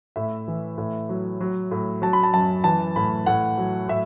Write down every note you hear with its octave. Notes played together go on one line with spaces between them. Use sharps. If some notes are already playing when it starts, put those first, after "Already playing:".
A2 E5
E3
A2
F#3
F#3
A2
F#3 A5
B5
A5
F#2 A5
E3 A5
A2 B5
A2 F#5
F#3
A2 E5